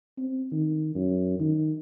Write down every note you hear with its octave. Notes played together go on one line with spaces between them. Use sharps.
C4
D#3
F#2
D#3